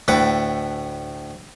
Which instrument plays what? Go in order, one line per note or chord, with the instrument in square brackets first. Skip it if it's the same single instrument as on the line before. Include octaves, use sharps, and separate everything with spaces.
[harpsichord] D2 A2 B4 F#5 G5